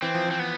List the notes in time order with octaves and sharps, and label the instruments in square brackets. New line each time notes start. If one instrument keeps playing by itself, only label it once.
[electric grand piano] E3 [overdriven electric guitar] C4
[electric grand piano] F3
[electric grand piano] E3 [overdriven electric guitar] C4
[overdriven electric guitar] B3